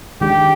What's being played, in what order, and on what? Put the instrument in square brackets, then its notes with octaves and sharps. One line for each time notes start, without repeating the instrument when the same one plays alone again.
[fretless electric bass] D#3 G#3 D4 [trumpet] G4